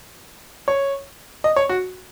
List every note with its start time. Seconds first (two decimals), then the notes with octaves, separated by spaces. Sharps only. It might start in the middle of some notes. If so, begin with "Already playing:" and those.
0.68 C#5
1.44 D#5
1.56 C#5
1.69 F#4